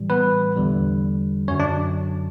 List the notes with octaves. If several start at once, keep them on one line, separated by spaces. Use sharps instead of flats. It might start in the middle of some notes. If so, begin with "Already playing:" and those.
Already playing: A2 E3 G3
B3 B4
E2 D3 G3
F#2 D3 F#3 C#4 C#5
D4 D5